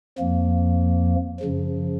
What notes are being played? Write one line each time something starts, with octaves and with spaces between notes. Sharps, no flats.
F2 F3 A#3
F#2 C#3 F3